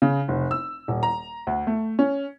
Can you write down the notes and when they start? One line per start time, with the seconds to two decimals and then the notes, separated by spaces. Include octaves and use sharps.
0.02 C#3
0.28 F1
0.51 E6
0.88 D#1
1.03 A#5
1.47 D2
1.67 A3
1.99 C#4